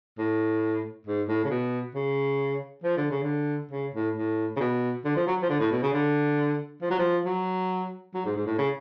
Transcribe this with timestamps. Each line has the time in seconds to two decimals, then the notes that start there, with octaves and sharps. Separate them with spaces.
0.18 A2
1.07 G#2
1.28 A2
1.44 C#3
1.50 B2
1.95 C#3
2.83 F3
2.97 D3
3.11 C#3
3.23 D3
3.71 C#3
3.94 A2
4.15 A2
4.56 C#3
4.60 B2
5.05 D3
5.16 F3
5.27 F#3
5.42 F3
5.49 D3
5.60 A2
5.71 B2
5.82 C#3
5.93 D3
6.82 F3
6.90 F#3
6.98 F3
7.25 F#3
8.14 F#3
8.26 G#2
8.36 G#2
8.47 A2
8.58 C#3